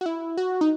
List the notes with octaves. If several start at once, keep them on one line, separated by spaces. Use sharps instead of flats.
F#4
E4
F#4
D#4